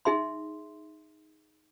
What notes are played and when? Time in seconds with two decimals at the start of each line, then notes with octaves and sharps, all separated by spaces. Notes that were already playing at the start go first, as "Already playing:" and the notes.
0.05 D#4 G#4 E5 C6